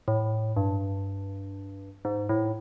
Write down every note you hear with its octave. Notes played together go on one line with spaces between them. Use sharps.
A2
G2
G#2
A2